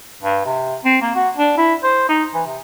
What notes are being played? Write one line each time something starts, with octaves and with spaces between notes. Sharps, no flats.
G2
C3
C4
A#3
F#4
D4
E4
C5
D#4
E3
C3